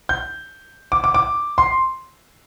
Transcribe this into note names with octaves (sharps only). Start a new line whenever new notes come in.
G6
D6
D6
D6
C6